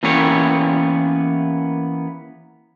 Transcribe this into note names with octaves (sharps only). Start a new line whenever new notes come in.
E3 A#3 B3 C#4 G4 C#5